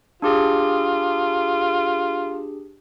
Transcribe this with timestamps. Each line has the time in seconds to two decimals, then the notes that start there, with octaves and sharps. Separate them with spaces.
0.22 D4 F4 G4 G#4